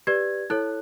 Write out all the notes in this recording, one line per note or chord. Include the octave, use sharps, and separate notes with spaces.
G4 B4 D5 G#6
E4 A4 C#5 F#6